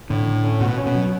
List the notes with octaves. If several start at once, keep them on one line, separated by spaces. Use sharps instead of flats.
A2 D3
D3
C#4
B2 F#4
C#4
B2
F#3